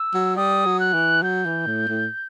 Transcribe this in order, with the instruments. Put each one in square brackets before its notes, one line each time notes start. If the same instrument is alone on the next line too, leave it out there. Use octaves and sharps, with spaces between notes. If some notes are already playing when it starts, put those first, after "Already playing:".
Already playing: [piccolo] E6
[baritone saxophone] F#3
[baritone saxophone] G3 [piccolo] D#6
[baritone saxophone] F#3
[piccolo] F#6
[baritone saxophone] E3
[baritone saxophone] F#3 [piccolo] G6
[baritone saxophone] E3
A2
A2